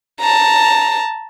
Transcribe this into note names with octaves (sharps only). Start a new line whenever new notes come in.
A5 A#5